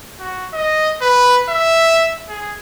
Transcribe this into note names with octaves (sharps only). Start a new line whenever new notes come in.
F#4
D#5
B4
E5
G#4